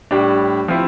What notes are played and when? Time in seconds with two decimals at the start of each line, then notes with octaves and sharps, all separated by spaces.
0.11 A2 G3 D4
0.68 F3 C4 E4